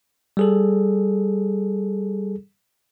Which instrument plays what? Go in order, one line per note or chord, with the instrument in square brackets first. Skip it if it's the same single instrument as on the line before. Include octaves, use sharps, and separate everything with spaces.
[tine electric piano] G3 G#4 A4